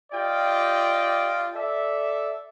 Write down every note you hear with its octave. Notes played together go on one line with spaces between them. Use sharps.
F4 G4 D5 D#5 G5
A4 D5 E5